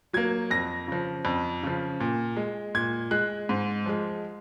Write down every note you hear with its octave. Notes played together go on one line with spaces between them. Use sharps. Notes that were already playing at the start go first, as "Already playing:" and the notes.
F#3 A#3 G#6
F2 A#6
C#3 F3
F2
C#3 F3
A#2
G#3
A#2 G#6
G#3 F#6
G#2
F3 G#3